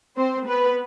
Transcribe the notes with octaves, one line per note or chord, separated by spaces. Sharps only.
C4 C5
B3 B4